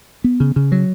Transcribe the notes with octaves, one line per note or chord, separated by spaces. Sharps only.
B3
C#3
C#3
F#3